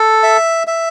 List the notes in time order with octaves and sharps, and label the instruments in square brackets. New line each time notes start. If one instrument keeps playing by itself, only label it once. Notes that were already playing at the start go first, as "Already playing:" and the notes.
Already playing: [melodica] A4
E5
E5